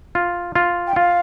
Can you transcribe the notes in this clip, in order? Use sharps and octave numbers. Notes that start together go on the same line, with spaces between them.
F4
F4
G5
F4 F5